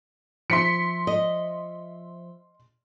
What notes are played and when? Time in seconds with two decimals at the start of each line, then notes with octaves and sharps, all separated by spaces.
0.50 F3 C5 E5 C6 B6 C#7
1.07 D#5